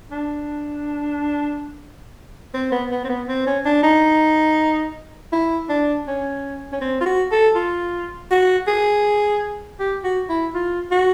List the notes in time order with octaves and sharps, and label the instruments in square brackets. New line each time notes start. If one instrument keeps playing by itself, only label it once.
[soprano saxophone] D4
C4
B3
B3
C4
B3
C4
C#4
D4
D#4
E4
D4
C#4
C#4
C4
F4
F#4
A4
F4
F#4
G#4
G4
F#4
E4
F4
F#4